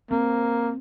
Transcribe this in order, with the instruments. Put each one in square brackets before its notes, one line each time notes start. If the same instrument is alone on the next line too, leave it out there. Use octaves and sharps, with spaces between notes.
[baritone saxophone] A#3 [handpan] C4